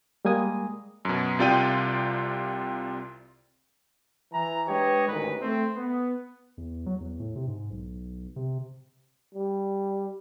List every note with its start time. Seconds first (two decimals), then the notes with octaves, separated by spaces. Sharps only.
0.25 G3 G#3 A#3 G#5 D#6
1.05 F#2 B2
1.39 C2 C3 F4 D5 G5 D#7
4.33 E3 A#5
4.67 G#3 D4 G4 B4 C#5 D#5
5.08 A1 D2 G#2 D#3 B4
5.41 A3 C4
5.77 B3
6.58 E2
6.86 F#3
7.00 E2
7.20 A2
7.36 C3
7.47 G#2
7.71 B1
8.36 C3
9.34 G3